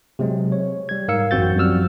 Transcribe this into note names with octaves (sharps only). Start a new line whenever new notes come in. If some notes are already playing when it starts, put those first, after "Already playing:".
C3 F#3 G#3 C4
C#5
G3 G#6
G#2 A#4 F5 E6 C#7
A1 F#2 C4 F#4 G6 A6
F#2 F3 G3 F#4 E6 F6